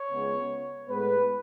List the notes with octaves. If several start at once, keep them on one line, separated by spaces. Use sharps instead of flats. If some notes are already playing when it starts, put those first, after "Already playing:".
Already playing: C#5
C#2 C#3 G#3 B3
A2 G#3 B3 B4